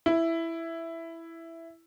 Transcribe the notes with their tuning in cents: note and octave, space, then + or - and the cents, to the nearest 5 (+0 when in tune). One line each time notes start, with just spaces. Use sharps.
E4 +5